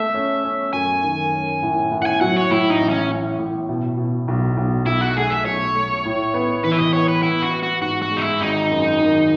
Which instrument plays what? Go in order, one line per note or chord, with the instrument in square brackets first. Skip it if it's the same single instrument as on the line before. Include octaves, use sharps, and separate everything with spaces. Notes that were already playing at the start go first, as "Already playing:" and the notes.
Already playing: [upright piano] A3 [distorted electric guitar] E5
[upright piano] C#4
C#4
[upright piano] F#2 [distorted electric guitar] G#5
[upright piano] D#3
C#4
A2
A2
[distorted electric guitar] F#5
G#5
[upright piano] F#3 [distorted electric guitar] F#5
[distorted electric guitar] C#5
[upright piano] A2 [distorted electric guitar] E4
[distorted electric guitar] D#4
[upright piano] A1
[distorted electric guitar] C#4
[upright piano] A2
A2
B2
B2
B1
B1
[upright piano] B1 [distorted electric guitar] E4
[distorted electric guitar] F#4
[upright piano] A3 [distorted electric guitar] G#4
[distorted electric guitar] E5
[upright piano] B1 [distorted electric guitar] C#5
[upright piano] A3
A2
B3
[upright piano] E3 [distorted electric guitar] B4
[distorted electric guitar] E5
D#5
[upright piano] B3 [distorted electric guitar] C#5
[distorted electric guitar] B4
[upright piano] B3 [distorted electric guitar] E4
[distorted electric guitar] F#4
[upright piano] B3
[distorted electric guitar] F#4
[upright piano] G#2 [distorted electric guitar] F#4
[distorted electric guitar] F#4
[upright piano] G#3
[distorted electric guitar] D#4
E4
[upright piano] G#1 [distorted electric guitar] D#4
[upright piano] F#2
D#3